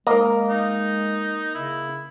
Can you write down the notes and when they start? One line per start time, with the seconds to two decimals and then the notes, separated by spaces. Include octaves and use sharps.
0.07 G#3 A#3 A#4 D#5
0.50 D#4
1.55 C#3 E4